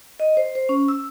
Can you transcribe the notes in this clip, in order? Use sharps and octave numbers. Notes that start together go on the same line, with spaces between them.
D#5
C5
C5
C#4
E6